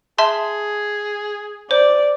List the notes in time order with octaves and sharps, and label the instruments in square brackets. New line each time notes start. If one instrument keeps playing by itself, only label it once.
[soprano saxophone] G#4 [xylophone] E5 A5 C6
[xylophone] C5 [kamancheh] D5